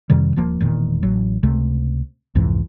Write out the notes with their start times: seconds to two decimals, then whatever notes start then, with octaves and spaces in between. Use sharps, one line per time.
0.10 F2 C3 D#3 G3
0.36 D#1 F3 A#3
0.61 E1 E2 A#2 D#3
1.03 A1 F#3
1.43 C#2 C3 A3
2.35 C2 F2 G#2 E3